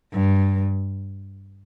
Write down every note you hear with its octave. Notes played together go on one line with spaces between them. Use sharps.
G2